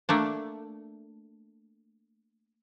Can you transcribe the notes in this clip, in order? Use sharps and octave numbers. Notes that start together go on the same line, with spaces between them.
A3 A#3 D4